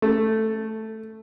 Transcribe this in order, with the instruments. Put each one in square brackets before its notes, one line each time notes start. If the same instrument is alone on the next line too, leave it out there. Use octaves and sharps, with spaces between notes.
[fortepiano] A3